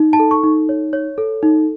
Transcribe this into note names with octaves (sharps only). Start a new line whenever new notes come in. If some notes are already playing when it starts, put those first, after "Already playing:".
Already playing: D#4
A5
A4
C#6
D#4
C#5
C#5
A4
D#4